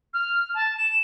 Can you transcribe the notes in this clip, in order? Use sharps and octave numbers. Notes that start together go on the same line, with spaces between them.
F6
A5
E7